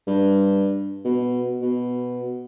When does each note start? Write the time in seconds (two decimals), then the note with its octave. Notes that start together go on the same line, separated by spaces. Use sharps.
0.07 G2
1.04 B2
1.61 B2